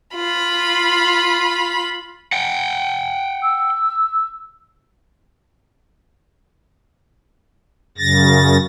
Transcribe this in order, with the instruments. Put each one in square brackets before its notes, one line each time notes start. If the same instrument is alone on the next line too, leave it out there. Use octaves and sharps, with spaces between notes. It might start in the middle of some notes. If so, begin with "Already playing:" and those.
[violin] F4 B5
[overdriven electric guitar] F#5 G5
[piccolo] E6
[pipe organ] F#2 C#3 A6 A#6